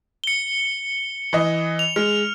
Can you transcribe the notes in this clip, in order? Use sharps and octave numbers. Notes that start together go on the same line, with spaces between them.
C#7 G7
E3 D#5
F7
G#3 F6